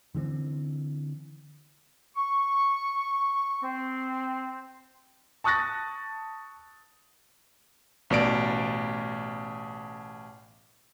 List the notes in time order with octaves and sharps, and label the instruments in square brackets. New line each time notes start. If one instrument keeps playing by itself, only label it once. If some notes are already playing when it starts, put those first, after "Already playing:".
[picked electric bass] D3 E3 G#3 C4
[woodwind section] C#6
C4
[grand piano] A5 C#6 D#6 F#6 A6 A#6
[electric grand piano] A1 B2 D5 D7